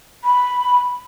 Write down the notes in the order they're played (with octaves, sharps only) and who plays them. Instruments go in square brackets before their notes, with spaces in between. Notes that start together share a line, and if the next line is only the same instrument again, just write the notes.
[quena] B5